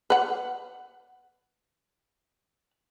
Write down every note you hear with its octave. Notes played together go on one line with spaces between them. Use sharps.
B4 F#5